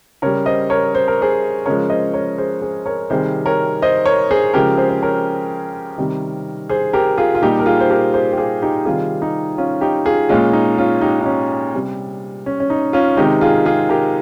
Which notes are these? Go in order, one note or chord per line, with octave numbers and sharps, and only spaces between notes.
C#3 G3 A#4 C#5
C5 D#5
A#4 C#5
C5
A#4
G#4 C5
C#3 F3 G#3 A#4 C#5
C5 D#5
A#4 C#5
G#4 C5
G#4 C5
A#4 C#5
C3 D#3 G3 G#4 C5
A#4 C#5
C5 D#5
A#4 C#5
G#4 C5
C#3 F3 G#3 G4 A#4
G#4 C5
C5
A#4 C#5
C3 D#3 G3
G#4 C5
G4 A#4
F4 G#4
F4
A#2 G3 D#4 G4
A#4
F4 G#4
C5
G4 A#4
G#4 C5
G4
F4 G#4
D#4 G4
C3 D#3 G3 F4 G#4
D#4 G4
C#4 F4
D#4 G4
F4 G#4
A#2 G#3 C#4 F4
D#4
C#4 F4
D#4 G4
D#4
C#4
C3 G3
C#4
C#4
D#4
C#4 F4
C3 D#3 G#3 D#4 G4
F4 G#4
F4 G#4
G4 A#4